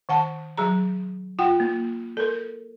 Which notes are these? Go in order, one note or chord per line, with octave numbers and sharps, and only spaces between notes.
D#3 F#5 A5
F#3 G#4 A#5
F4 F#5 G5
A#3
A4 A#4